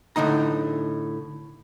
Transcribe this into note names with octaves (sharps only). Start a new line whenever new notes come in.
A2 D3 D#4 A#5